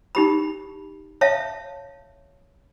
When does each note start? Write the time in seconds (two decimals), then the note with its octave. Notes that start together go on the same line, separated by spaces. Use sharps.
0.15 D#4 G4 B5
1.21 C#5 E5 F5 A5